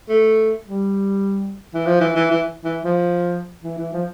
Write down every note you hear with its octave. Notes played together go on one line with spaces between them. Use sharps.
A3
G3
E3
F3
E3
E3
E3
E3
F3
E3
E3
F3